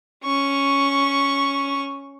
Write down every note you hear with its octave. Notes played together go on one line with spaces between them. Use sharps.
C#4 C#6